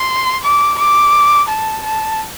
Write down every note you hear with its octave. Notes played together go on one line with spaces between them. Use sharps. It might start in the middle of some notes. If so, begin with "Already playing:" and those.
Already playing: C6
D6
D6
A5
A5